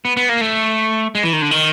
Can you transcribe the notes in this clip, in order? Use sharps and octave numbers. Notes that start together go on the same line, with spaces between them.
B3
B3
A#3
A3
G#3
E3
D#3
D3
D#3